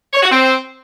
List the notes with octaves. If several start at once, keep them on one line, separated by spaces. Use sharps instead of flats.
C#5
F#4
C4